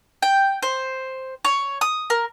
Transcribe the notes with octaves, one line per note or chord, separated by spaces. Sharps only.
G5
C5
C#5
D#6
A#4